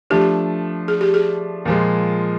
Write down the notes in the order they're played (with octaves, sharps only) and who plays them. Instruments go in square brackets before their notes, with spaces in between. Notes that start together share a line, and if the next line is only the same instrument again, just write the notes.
[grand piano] F3 A3 D4 [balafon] G4
[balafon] G#4
G4
G#4
[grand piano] A#2 F3 G#3